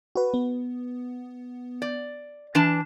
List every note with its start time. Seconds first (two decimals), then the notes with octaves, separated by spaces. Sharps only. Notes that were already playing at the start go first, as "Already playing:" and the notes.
0.15 F#4 B4
0.34 B3
1.82 D5
2.55 E3 D4 A5